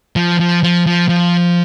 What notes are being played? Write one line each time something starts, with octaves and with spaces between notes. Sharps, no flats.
F3
F3
F3
F3
F3